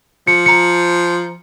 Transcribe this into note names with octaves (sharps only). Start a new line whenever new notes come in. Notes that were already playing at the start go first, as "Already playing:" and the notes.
F3 C#7
A#5 C#7